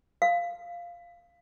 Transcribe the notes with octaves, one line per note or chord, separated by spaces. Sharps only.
F5